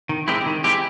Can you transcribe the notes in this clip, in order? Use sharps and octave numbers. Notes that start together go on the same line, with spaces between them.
D#3
G#3 C4 E4 G4
D#3
G#3 C4 E4 G4